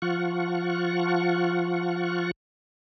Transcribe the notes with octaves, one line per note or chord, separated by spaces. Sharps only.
F3 F4 F#5 C#6